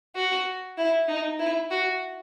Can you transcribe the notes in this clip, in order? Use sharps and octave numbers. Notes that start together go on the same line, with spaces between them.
F#4
E4
D#4
E4
F#4